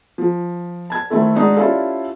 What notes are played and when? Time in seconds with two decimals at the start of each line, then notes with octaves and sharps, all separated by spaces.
0.18 F3
0.90 A5 G#6
1.10 D#3 A3 C4 E4 A4
1.35 G#3 D4 D#4 F#4
1.56 C#4 E4 F4 G4 A4 D5